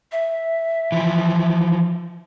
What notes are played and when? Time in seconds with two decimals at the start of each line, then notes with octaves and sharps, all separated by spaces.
0.12 E5
0.92 E3 F3